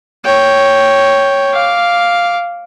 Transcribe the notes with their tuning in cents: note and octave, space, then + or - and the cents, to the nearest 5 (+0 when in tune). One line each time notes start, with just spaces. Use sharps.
C#5 +0 G5 +0
F5 +0 D6 -10